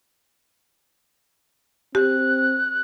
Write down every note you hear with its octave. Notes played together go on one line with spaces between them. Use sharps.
C4 G4 F#6